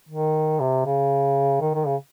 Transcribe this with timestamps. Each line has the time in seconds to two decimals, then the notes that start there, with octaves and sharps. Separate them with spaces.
0.09 D#3
0.60 C3
0.86 C#3
1.61 D#3
1.74 D#3
1.87 C#3